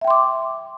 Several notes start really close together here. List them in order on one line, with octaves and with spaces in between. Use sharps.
E5 G5 C6 D6